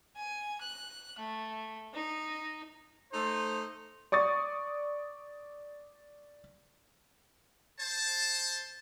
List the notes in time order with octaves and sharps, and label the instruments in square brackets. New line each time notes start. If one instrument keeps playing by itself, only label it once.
[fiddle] G#5
F#6
A3
D#4
[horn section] A3 D#4 A4 C5
[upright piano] D5 C#6 D#6 A6
[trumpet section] C5 A5